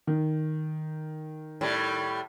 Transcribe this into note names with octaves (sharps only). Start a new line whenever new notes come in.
D#3
A2 G3